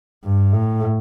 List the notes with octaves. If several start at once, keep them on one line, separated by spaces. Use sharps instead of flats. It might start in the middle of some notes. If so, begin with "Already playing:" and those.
G2
A2